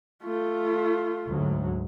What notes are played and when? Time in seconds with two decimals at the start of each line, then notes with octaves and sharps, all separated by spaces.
0.24 A3 F4
1.27 D2 G#2 F#3